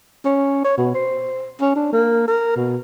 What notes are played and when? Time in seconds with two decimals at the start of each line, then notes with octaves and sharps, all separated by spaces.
0.25 C#4
0.64 C#5
0.77 B2
0.95 C5
1.61 C#4
1.76 D4
1.93 A#3
2.28 A#4
2.56 B2